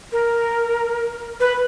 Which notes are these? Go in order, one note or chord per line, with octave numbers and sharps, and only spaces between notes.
A#4
B4